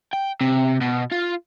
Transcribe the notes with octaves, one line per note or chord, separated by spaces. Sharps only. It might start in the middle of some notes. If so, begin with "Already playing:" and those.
G5
C3
B2
F4